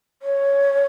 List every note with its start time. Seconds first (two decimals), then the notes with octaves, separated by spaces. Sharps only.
0.22 C#5